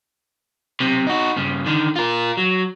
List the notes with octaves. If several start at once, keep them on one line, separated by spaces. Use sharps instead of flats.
B1 C3
D#4 F#4
G2 C#3
D3 D#3
F4 A#4
F#3